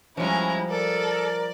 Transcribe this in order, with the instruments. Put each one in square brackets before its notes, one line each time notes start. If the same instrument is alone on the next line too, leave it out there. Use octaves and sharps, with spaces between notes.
[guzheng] F3 G3 [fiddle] G#3 A#5 [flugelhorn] C#4 [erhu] E4
[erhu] A4 [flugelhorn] A#4 [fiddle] D5